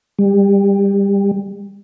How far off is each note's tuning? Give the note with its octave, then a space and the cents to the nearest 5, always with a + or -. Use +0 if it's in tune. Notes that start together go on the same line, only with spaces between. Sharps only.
G3 +25